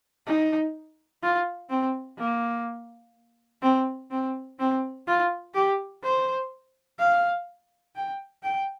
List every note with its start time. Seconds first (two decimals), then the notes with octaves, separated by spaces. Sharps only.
0.26 D#4
1.23 F4
1.70 C4
2.18 A#3
3.62 C4
4.11 C4
4.59 C4
5.07 F4
5.54 G4
6.03 C5
6.99 F5
7.96 G5
8.43 G5